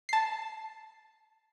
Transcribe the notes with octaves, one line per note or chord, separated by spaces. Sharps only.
A5 C7